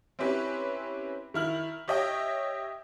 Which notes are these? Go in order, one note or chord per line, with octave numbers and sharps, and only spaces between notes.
C4 C#4 E4 G4 B4
D#3 E4 F6 F#7
G4 C#5 D#5 E5 G5